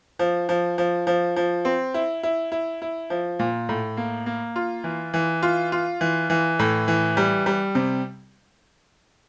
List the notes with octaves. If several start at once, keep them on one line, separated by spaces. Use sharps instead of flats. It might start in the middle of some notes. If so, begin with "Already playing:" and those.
F3
F3
F3
F3
F3
C4
E4
E4
E4
E4
F3
A#2
A2
A#3
A#3
F4
E3
E3
F4
F4
E3
E3
A2
E3
G3
G3
C3